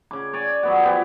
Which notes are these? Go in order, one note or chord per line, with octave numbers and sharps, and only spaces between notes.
C#3 D6
C#5 D5 G#5
F#3 B3 F#4
F3 B3 G4